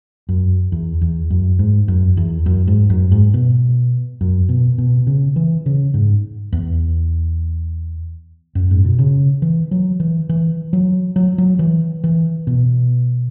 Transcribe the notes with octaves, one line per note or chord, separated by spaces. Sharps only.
F#2
E2
E2
F#2
G#2
F#2
E2
F#2
G#2
F#2
G#2
B2
F#2
B2
B2
C#3
E3
C#3
G#2
E2
F#2
G#2
B2
C#3
E3
F#3
E3
E3
F#3
F#3
F#3
E3
E3
B2